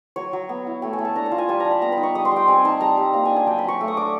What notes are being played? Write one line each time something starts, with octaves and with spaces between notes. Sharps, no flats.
F#3 C#5
F#3
B3
E4
A3 G5
G#5
A3
A5
D4 A#5
A5
F4
G#5
G3 A5
G3 A#5
B5
B3 A#5
B5
D#4
C#6
G3 D#6
C6
G3 G5
C4 G#5
D#4 A5
G3 A#5
G3
A#3 A#5
D4 G#5
G#5
F#3 G5
B5
F#3 C#6
A3
D#6
D4 D6